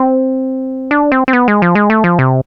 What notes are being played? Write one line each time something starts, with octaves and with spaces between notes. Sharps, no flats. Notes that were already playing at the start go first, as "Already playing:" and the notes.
Already playing: C4
D4
C4
C4
B3
G#3
F3
G#3
A3
F3
C3